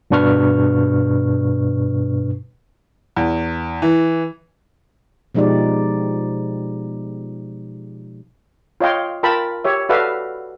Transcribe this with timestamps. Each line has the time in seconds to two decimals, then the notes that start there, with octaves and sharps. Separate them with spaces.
0.11 G2 B2 D4 B4 C#6 F6
3.16 E2
3.82 E3
5.35 B2 F3 G#3 D#4 G4 D5
8.80 F4 C#5 D#5 F5 G5 C6
9.23 F4 A#4 G5 A5 B5
9.64 G4 C#5 E5
9.89 F#4 A4 B4 D5 E5 F5